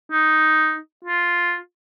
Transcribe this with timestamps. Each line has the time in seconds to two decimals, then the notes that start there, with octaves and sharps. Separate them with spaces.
0.12 D#4
1.05 F4